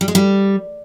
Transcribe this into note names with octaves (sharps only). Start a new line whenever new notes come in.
G3
G#3
G3